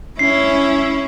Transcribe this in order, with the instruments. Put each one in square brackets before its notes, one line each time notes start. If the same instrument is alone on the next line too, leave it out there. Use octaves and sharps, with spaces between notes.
[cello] C#4 E4 [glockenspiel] C7